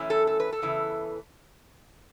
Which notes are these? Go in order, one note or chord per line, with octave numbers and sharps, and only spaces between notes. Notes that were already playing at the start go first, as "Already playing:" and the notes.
Already playing: F#2 E3 A3 C#4
A4
A4
B4
A4
E2 C#3 E3